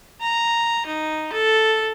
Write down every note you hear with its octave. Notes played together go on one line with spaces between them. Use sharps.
A#5
D#4
A4